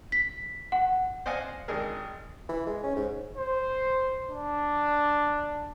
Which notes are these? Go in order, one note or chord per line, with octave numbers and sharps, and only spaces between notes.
B6
F#5
C5 D5 D#5 F5 F#5 G#5
G#1 D4 D#4 G#4 A#4
E3
G#3
C#4
G#2
C5
D4